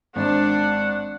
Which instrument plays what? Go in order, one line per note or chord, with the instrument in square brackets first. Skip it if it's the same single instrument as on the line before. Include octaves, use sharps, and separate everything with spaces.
[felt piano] G#1 [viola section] D4 [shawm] F#5